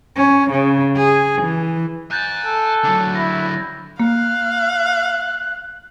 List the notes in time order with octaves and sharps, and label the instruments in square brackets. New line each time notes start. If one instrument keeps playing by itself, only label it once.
[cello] C#4
C#3
G#4
E3
[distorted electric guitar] G#5 A#5 [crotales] F#6 G6 A6
[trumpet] A4
[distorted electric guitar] D3 F#3
[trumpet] E4 [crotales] A#6
[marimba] A#3 [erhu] F5 [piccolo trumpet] F#6